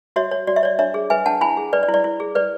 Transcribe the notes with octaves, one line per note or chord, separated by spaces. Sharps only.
F#4 C#5 E5
C#5
F#4 D5
E5
C#5 D5
D4 C#5 E5
G#4
B4 E5 G#5
D4 F#5 A5
E4 G#5 B5
G#4
B4 D5
D5
E4
D5
E4
G#4
B4 D5